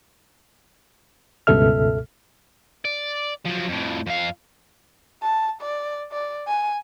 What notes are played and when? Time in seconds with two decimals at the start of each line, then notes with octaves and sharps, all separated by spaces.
1.47 C#2 G2 B2 A4 E5 F6
2.85 D5
3.45 F3 F#3
3.68 F2 A2
4.06 F2 F5
5.23 A5
5.62 D5
6.12 D5
6.48 G#5